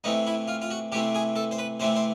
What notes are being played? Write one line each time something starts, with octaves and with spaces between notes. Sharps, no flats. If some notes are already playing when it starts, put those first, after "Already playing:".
C3 E3 A3 C4 D#4
E4
F4
F4
F#4
C3 E3 A3 C4 G4
G#4
A4
C5
B4
C3 E3 A3 C4 C5
C5